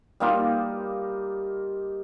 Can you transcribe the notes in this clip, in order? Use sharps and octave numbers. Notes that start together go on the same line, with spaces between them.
G3 A#3 D#4 F4